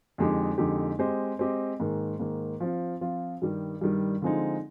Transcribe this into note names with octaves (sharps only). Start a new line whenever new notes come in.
F2 D3 G#3 D#4 G4
F2 D3 G#3 D#4 G4
G#3 C4 G4 C5 D#5
G#3 C4 G4 C5 D#5
G#2 D#3 A#3
G#2 D#3 A#3
F3 C4 F4
F3 C4 F4
G2 D#3 G3
G2 D#3 G3
D3 F3 G#3 C4 D#4